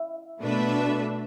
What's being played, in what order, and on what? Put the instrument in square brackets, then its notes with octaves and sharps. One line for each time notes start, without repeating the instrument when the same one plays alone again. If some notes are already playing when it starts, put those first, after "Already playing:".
Already playing: [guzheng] E4
[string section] B2 A3 D4 B4 E5